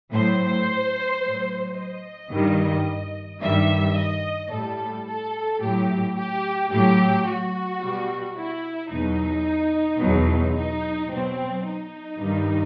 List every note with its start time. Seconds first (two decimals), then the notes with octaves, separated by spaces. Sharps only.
0.12 A2 F#3 C5
1.22 A2 F#3
1.76 D#5
2.32 G2 D#3 G3
3.41 G2 D#3 G3 E5
3.97 D#5
4.51 A2 G3 A4
5.06 A4
5.61 A2 F#3 G4
6.16 G4
6.71 A2 F#3 G4
7.26 F#4
7.81 B2 G3
8.36 E4
8.90 E2 B2 F#3 D#4
10.01 E2 B2 F#3
10.56 D#4
11.11 B2 F#3 C4
11.65 D#4
12.20 G2 D#3 G3